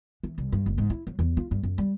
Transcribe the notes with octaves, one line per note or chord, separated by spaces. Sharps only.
E3
C2
G2
F#1
G#2
E4
F#3
E2
F4
G2
F#2
G3